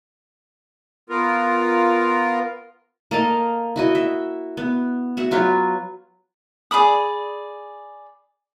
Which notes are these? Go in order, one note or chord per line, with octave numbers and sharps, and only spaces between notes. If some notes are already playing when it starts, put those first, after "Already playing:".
B3 F4 A#4
A#3 A4 D#5 F5
E4 F#4 D#5
E5
B3
F#4 E5 F#5
F#3 F4 B4 C#5
G#4 D5 B5 D#6